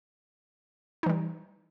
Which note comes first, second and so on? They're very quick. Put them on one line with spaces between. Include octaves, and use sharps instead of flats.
D#4 E3 G3